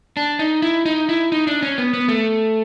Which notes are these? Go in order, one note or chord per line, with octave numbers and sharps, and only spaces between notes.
D4
D#4
E4
D#4
E4
D#4
D4
C#4
B3
B3
A3